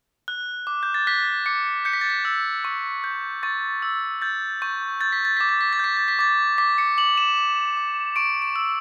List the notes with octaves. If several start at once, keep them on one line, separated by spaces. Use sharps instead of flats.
F#6
D6
G6
A6
F#6 B6
D6 C#7
G6 C#7
B6
A6
B6
E6
C#6
G6
C#6 A6
E6
G6 A6
C#6 G6
G6 A6
B6
A6
D6 B6
A6
B6
A6
G6 B6
A6
B6
D6 A6
D6 B6
C#7
D6 F#7
E7
D6
D6
C#6 D7
D7
E6